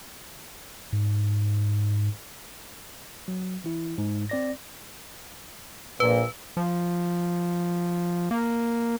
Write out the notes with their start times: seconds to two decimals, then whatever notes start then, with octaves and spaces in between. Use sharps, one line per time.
0.93 G#2
3.28 F#3
3.64 E3 E4
3.98 G#2
4.29 C4 D5 A#6
6.00 A#1 A#2 B4
6.57 F3
8.31 A#3